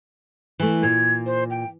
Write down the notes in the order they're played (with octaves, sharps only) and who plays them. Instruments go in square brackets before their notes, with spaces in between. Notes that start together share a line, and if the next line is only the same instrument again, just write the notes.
[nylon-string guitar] E3 A3
[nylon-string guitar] A#2 [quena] G#6
[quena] C5
G5